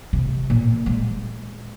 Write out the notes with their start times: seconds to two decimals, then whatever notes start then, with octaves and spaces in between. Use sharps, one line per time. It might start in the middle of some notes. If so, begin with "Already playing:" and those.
0.13 C3
0.50 A#2
0.86 G#3